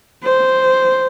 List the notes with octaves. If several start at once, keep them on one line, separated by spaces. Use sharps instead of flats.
C5